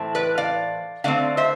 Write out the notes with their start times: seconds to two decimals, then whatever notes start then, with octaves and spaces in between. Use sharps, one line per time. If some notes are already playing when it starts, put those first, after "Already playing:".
Already playing: A2 E3 A3 C4
0.15 B4 D5
0.38 D5 F5
1.04 D3 A3 C4 D5 F5
1.37 C5 E5